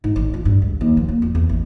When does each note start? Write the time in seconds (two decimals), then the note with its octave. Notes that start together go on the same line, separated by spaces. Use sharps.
0.04 G#2
0.16 A1
0.34 F4
0.45 G2
0.62 C#2
0.81 D#2
0.97 F3
1.09 A#3
1.22 F2
1.35 E2
1.49 A1